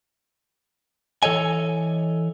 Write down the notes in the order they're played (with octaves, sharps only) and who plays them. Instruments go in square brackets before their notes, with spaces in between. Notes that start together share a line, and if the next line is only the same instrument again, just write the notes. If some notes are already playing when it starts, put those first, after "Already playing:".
[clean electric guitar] E3 A4 C#5 D#5 G#5